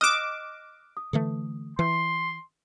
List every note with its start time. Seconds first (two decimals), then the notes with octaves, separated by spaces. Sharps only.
0.01 D#5 D6 F6 F#6 E7
0.97 D#6
1.13 D3 E3 A3
1.79 E3 C6